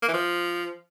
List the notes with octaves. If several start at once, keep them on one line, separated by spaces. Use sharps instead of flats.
A#3
E3
F3